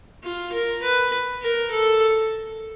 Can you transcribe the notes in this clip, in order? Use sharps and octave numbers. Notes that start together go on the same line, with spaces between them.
F4
A#4
B4
A#4
A4